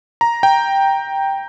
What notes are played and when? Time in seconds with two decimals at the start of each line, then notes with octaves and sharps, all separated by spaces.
0.21 A#5
0.43 G5